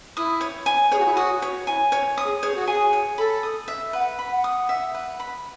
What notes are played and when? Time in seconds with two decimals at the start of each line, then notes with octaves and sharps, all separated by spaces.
0.17 E4 D#6
0.41 C#5
0.66 G#5
0.92 G#4 C#5
0.99 F#4
1.06 E4
1.13 F#4 D#6
1.42 C#5
1.67 E4 G#5
1.92 C#5
2.18 D#6
2.24 G#4
2.43 G#4 C#5
2.55 F#4
2.67 G#4 G#5
2.93 C#5
3.17 A4 B5
3.43 D#6
3.68 E5
3.93 B4 F#5
4.19 B5
4.32 F#5
4.44 D#6
4.69 E5
4.94 B4
5.20 B5